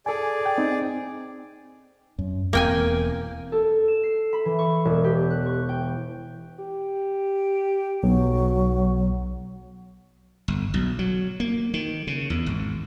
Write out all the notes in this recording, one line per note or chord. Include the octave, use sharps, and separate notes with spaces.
G#4 A4 D5 G#5
G5
C4 D#4
F#2
E1 E2 A#3 C4 G5 G#5
A4
E7
C7
B5
E3
C#6
E1
G4
F#6
C#6
G5
G4
B1 F#3
G1
B1
F#3
A#3
D#3
C#3
E2
G#1